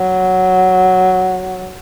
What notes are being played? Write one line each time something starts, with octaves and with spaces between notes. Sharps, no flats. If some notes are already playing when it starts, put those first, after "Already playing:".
Already playing: F#3